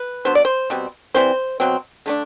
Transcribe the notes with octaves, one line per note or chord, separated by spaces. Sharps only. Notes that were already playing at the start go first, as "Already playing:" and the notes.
Already playing: B4
F#3 B3 D4 C5
D5
C5
B2 G3 C4
E3 G3 C4 C5
B2 F#3 C4
D3 A3 D4